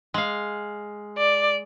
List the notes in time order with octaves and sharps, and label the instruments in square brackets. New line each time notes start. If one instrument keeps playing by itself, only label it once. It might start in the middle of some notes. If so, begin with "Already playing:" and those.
[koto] G#3 F5
[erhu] D5